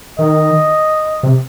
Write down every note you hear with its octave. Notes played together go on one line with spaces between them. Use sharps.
D#3 D#5
C3